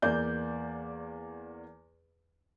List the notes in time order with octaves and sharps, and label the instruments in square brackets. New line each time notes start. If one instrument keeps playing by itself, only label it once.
[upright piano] E2 A#3 D5 G6